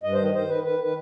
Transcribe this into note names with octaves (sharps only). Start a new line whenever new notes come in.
G2 D#5
D#3 C5
D#5
D#3 C5
D#3 B4
D#3 B4
D#3 B4